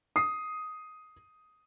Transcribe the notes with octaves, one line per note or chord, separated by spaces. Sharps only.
D#6 C7